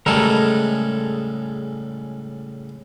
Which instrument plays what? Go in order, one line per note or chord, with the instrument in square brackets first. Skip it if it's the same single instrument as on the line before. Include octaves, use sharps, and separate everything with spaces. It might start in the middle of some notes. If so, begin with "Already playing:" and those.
[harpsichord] A2 C#3 G3 [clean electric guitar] G#3 A4 A#4